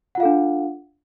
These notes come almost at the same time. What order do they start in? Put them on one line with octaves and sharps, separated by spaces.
F#5 F4 F5 A4 D4